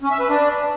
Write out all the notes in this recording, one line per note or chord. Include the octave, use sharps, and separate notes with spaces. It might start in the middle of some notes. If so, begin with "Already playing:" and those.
C#4
E5
B4
D4